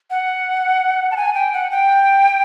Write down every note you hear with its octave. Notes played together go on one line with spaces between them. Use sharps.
F#5
A5
G#5
G5
F#5
G5